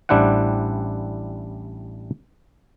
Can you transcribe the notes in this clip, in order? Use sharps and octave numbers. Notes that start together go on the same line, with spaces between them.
A1 G3 D4 E4 C5 F#5